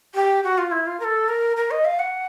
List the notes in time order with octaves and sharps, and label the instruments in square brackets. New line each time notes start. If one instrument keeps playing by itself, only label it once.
[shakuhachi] G4
F#4
F4
E4
F4
A#4
A4
A#4
A#4
D#5
F5
F#5